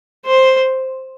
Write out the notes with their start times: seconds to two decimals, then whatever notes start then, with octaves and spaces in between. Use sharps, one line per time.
0.26 C5